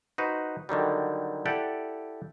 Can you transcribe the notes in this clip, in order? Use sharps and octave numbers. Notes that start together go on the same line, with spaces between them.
D#4 F#4 B4 C5
D3 D#3 F#3 G3
E4 G4 A4 D5 F#5